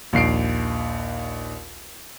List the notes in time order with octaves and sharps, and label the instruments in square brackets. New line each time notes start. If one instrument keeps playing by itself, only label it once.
[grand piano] A#1 D#2 C7 D7